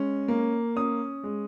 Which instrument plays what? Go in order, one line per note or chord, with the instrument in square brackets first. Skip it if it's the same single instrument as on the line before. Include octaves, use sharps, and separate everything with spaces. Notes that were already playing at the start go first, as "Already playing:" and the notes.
Already playing: [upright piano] G#3 C#4
A#3
C#4 D#6
G#3